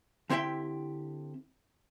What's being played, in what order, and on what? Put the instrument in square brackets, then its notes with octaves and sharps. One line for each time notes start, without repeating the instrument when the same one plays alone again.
[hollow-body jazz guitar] D3 C4 E4 G4 E5 G5